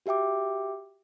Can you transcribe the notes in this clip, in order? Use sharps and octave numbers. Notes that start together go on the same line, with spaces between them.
F#4 G4 E5 G5 D6